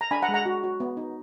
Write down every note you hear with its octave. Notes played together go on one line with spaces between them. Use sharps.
A#5
D4 G#5 B5
F#5 A#5
G#3
F#5 A#5
F#4
F#4
B3
D#4